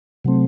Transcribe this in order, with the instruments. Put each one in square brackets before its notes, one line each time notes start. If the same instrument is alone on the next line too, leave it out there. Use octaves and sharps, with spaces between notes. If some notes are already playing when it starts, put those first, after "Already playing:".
[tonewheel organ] C3 F#3 A3 C4